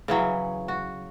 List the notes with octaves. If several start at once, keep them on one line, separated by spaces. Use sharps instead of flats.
C#3 E3 F#3
F#4